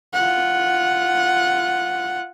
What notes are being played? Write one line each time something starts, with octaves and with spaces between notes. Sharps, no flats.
F4 F#5